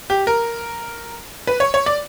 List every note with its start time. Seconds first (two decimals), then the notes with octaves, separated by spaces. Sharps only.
0.10 G4
0.27 A#4
1.47 B4
1.60 C#5
1.74 C#5
1.86 D5